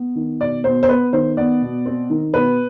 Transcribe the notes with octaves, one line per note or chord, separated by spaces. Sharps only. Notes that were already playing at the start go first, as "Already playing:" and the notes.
Already playing: B3
D#3
B2 D5
B2 C5
C5
B3 B4
D#3 C5
B3 D5
B2
C4
D#3
B2 B4